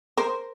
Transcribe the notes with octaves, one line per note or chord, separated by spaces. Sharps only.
A#4 C5